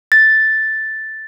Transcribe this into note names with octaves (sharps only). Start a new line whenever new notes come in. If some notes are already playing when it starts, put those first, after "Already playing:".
A6